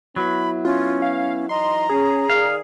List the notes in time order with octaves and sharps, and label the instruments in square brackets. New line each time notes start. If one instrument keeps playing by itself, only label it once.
[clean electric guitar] F#3 [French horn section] B3 E4 [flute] B5
[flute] C#4 [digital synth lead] F4
[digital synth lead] F5
[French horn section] E3 D#4 D#5 [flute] A#5 [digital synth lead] C6
[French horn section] C#4 [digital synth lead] G#4
[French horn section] D#3 A#4 D5 [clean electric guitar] F5